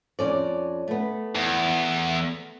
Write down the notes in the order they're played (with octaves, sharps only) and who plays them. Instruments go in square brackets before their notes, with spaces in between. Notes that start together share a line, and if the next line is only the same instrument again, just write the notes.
[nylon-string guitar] F2 C#4 D5
A3 B3
[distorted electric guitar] E2